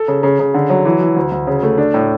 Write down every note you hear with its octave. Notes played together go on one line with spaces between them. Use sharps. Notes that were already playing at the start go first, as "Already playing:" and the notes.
Already playing: A4
C#3
C#3
C#3
D3
F#3
E3
E3
D2
D2
C#3
A3
D4
A2